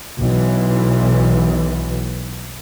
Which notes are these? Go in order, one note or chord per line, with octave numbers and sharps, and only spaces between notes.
B1 E3